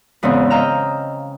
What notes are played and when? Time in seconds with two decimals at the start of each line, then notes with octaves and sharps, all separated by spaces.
0.23 E2 G#2 C#3 B3 C4
0.50 D#5 F5 G5 A#5 E6 F6